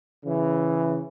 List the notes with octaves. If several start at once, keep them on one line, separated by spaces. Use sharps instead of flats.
C#3 E3